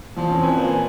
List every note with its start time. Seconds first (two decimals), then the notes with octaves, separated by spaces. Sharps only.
0.17 E2 F3
0.29 C4 C#4
0.43 B4 C5 G#5
0.56 A#2
0.73 G#5